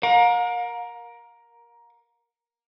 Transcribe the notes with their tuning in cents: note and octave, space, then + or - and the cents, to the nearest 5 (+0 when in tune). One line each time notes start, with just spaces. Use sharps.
A#4 +10 F5 +45